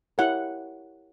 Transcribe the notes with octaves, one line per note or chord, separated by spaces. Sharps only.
E4 G4 A#4 C#5 F#5